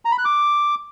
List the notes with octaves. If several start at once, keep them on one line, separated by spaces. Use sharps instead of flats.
A#5
B5
F#6
D6